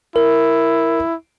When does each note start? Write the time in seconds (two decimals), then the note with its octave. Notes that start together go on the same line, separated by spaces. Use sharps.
0.16 E4 A#4